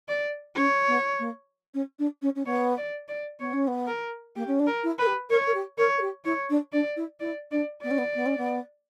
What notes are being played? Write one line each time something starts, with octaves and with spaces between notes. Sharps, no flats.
D5
C#4 C#5
B3
A#3
C#4
D4
C#4
C#4
B3 C#5
D5
D5
B3 C#5
C#4
B3
A#4
A#3 G4
C#4
D4
A#4
E4
A#4 B4
G4
A#4 C#5
A#4
G4
A#4 C#5
A#4
G4
E4 C#5
D4
D4 D5
E4
E4 D5
D4 D5
B3 D5
C#4
B3
B3
C#4
B3